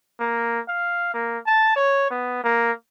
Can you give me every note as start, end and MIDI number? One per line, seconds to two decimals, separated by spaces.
0.20 0.60 58
0.68 1.13 77
1.14 1.38 58
1.46 1.72 81
1.76 2.08 73
2.10 2.41 59
2.44 2.72 58